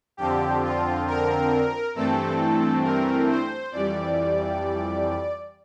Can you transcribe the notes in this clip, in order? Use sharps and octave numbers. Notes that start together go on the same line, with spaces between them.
F2 D3 F3 C4 G4
F4
A#4
G2 E3 A3 C4 A4
A#4
C5
F2 E3 G3 D5